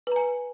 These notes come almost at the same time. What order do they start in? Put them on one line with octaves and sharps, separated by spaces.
B4 A#5 G#5